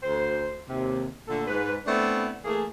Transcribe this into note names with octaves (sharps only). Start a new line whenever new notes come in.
D2 C5
D#2 C3
A#2 D3 A3 A4
G#2 B4
A3 B3 C4 D4 E4
E3 A3 A#3 G#4